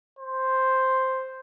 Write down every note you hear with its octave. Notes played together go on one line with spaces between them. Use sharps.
C5